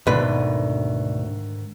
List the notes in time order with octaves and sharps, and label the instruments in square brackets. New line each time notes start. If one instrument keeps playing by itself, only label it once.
[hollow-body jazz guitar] D2 B4 [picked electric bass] G#2 D3 D#3 [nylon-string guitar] B2 D5